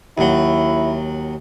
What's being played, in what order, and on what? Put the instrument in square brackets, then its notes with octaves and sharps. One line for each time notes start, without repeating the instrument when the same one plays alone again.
[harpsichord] D#2 F#3 [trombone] E4